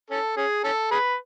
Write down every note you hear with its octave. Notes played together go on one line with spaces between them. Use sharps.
C#4 A4
C#4 G#4
C#4 A4
G#4 B4